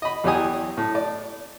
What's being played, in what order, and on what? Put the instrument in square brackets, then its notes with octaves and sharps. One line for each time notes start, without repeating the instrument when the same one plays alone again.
[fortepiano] D#5 B5
E2 E3 F#3 G4 G#5 D#6
A2
D5